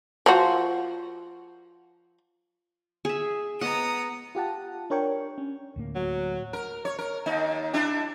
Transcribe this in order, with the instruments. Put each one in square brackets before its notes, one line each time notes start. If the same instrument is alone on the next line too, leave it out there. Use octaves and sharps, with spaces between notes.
[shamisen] F3 F4 F#4
[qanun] G#4 E5
[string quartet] B3 A#5 D#6 [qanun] D#5 F#5
[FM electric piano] F4 G4 F#5 A5
D4 A#4 C#5 G5 C#6
C#4
[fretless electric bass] D2 A2 A#3
[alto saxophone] F#3
[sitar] A#4
C#5
A#4
D#2 D#4
D4 E4 G4